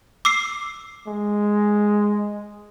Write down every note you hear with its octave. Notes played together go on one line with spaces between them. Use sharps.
D6 E6 C7
G#3